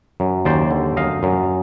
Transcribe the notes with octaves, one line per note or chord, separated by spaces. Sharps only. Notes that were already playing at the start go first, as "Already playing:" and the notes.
F#2
D#2 C5 D5
D3
F#2 D#5 F5
F#2